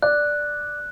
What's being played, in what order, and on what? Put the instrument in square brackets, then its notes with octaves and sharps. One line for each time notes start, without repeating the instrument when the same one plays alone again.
[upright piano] D5 [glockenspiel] F#6